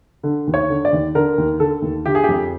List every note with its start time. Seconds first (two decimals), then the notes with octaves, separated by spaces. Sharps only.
0.23 D3
0.47 D#2
0.54 C#5
0.70 D3
0.85 D5
0.93 D#2
1.15 D3 A#4
1.38 D#2
1.60 D3 A4
1.82 D#2
2.06 D3 G4
2.15 G#4
2.24 F2 G4